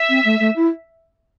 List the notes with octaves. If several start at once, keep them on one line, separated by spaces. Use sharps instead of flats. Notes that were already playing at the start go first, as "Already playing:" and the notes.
Already playing: E5
C4
A3
A3
E4